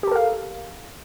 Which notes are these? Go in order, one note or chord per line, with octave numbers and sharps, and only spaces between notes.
G4 A4 A#4 F5